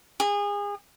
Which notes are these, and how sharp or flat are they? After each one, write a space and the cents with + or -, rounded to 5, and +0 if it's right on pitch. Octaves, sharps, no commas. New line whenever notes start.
G#4 -30